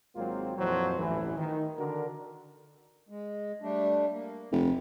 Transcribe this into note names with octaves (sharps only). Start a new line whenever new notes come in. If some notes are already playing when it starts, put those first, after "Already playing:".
G#1 F#3 G#3 A#3 C4 F4
F2 A#2 E3 F#3 C5
A1 D2 G2 E3
D#3
D3 D4 F#4 A#4
G#3
G3 A3 D4
A#3
F1 D2